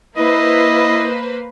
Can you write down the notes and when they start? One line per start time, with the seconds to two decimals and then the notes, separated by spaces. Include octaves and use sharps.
0.17 A#3 E4 B4 C5 D#5